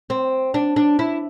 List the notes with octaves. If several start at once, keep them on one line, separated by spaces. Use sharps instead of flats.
C4
D4
D4
E4